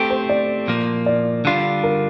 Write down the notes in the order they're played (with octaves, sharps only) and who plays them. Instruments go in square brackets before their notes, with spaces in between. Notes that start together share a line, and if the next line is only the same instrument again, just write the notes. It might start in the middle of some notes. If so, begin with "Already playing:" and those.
Already playing: [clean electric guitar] A3 C4 G4 [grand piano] A4
[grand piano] C5
D5
[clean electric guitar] A#2 F3 A#3
[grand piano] D5
[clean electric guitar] D3 G3 D4 F4
[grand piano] A#4